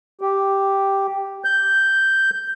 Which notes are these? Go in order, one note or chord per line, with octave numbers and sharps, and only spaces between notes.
G4
G6